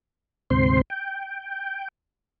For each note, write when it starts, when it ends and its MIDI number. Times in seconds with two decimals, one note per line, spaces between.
0.50 0.81 38
0.50 0.81 44
0.50 0.81 48
0.50 0.81 60
0.50 0.81 72
0.50 0.81 84
0.90 1.88 79